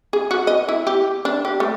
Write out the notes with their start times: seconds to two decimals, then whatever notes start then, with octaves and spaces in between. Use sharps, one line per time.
0.13 G#4
0.31 F#4
0.47 D#5
0.69 E4
0.87 G4
1.25 D4
1.45 G4
1.60 A3